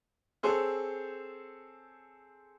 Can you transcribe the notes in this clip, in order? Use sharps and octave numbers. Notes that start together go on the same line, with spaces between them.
C4 G#4 A4 C5 C#5